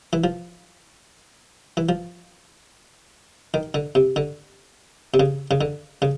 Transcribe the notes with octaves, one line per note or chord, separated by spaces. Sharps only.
E3
F3
E3
F3
D#3
D3
C3
D3
C3
C#3
C#3
D3
C#3